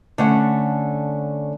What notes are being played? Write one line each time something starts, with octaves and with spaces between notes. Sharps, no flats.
D3 A3 C#4 F#5